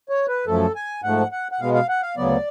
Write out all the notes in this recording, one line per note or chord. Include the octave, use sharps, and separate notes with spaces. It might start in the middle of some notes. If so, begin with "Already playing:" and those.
C#5
B4
F#2 F3 A3 A4
G#5
G#2 F3 A3 F#5
F#5
F#5
B2 G#3 B3 F5
F5
F#5
F5
D2 C#3 F#3 B3 D5